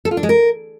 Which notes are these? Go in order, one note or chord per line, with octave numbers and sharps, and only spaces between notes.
A4
F4
D4
G#3
A#4